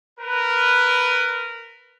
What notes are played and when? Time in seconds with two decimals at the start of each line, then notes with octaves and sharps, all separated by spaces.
0.20 A#4 B4